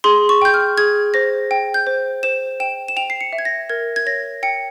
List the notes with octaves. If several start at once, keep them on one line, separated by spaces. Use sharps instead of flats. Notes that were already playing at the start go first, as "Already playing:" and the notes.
G#4 C6
C#6
G5 G6
F6
G#4 G#6
C5 A#6
G5
G6
C5
C5 E7
G5 E7
E7
G5 F7
C7
C#7
E5
G#6
A#6
A#4 G#6
G#6
C#5 A#6
G5 C#7